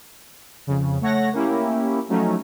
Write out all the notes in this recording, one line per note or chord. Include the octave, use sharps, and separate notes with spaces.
F2 C#3
A3 C#5 F#5 A#6
A#3 C#4 E4 G4
F3 F#3 A3 C#4 D#4